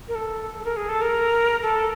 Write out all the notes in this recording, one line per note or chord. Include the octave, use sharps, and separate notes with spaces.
A#4
A4
A4
A#4
G#4
A4
A#4
A4